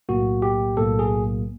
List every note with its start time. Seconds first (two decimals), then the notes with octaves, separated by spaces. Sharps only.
0.09 B1 A2 F#3 A#3 F#4
0.42 G4
0.77 B1 A2 F#3 A#3 A4
0.99 G#4